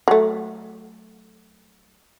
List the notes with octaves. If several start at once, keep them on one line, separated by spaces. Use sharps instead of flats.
F#3 A3